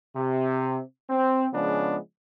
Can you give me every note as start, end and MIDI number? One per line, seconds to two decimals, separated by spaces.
0.16 0.79 48
1.10 1.47 60
1.53 1.97 49
1.53 1.97 53
1.53 1.97 56
1.53 1.97 59
1.53 1.97 61
1.53 1.97 62